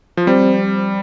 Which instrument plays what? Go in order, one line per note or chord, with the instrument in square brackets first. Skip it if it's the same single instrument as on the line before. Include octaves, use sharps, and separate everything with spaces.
[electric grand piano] F3
[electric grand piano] G3 [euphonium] C4